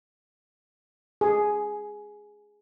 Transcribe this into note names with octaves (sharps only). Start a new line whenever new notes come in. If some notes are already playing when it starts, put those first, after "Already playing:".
G#4